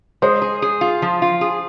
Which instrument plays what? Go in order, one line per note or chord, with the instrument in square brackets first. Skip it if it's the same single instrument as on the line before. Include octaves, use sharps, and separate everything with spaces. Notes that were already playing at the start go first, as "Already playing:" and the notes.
[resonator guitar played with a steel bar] G#3 [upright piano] C5
[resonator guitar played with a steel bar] G#4
G#4
F4
F3
F4
G#4